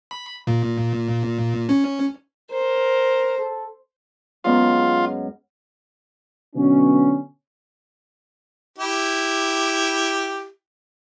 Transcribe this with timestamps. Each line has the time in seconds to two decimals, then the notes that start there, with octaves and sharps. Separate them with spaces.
0.11 B5
0.47 A#2
1.69 C#4
2.50 A#4 C5
3.38 A4
4.44 F#2 G#3 B3 F4
6.55 B2 D3 F#3 B3 C#4
8.78 E4 G4